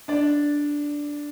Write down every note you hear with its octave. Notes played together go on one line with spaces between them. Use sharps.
D4 D5